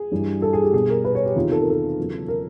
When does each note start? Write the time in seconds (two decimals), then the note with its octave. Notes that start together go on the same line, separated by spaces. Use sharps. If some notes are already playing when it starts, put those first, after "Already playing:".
Already playing: G#4
0.11 G2 E3 G3
0.42 A4
0.53 G#4
0.63 G4
0.73 B2 G3 G#4
0.89 A#4
1.05 B4
1.15 C#5
1.26 G4
1.35 E2 C3 D#3 F4
1.51 A4
1.60 A#4
1.70 A4
1.98 E2 C#3 F#3
2.28 A#4